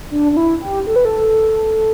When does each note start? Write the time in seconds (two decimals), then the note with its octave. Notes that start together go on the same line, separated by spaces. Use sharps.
0.11 D4
0.32 D4
0.37 E4
0.62 G4
0.87 A4
0.96 B4
1.05 A4